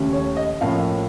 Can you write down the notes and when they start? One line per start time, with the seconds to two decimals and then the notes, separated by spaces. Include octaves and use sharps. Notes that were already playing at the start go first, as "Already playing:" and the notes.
Already playing: D#2 C#3 A3 C#4
0.13 C#5
0.37 D#5
0.61 A2 F3 A#3 C#4 F5